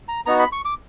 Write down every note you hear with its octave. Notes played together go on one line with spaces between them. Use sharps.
A#5
B3 D#4 F#4 A#5
B5
C#6
D6